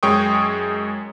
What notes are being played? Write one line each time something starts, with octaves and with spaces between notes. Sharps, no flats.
F#2 G#3 C#5 G5 C#6 D#6